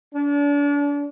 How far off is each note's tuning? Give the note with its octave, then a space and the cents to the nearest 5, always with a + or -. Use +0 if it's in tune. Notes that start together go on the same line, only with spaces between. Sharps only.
D4 -35